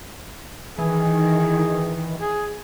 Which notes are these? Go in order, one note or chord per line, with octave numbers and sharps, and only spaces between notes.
D#3 E3 G#4
G#4